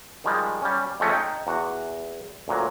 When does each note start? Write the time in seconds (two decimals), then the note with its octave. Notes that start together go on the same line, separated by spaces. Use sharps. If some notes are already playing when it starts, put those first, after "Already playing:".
0.24 D#3 F3 G3 G#3
0.62 G3 C#4
1.00 F2 G#3 A3 C#4
1.13 D#4 G5
1.47 E2 F#4 F#5
2.48 D2 A#2 F#3